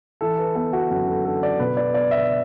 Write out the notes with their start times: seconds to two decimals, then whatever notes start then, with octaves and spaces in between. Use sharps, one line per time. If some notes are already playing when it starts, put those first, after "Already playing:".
0.21 E3 A4
0.38 B4
0.55 B3 A4
0.73 F#4
0.91 F#2 F#4
1.08 A4
1.25 D4 A4
1.43 D5
1.59 B2 B4
1.77 D5
1.94 B3 D5
2.11 E5